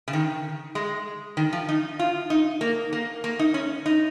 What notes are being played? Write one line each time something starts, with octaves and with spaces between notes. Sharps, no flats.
C#3
D#3
G#3
D#3
F3
D#4
F4
D#4
A#3
A#3
A#3
D#4
C#4
D#4